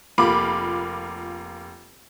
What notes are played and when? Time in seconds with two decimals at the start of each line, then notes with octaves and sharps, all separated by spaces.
0.18 F1 A#3 F4 B5 D6